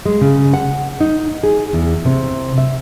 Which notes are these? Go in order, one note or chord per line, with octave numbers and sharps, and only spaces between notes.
G#3
C#3
F#5
D#4
G#4
E2
C3
E5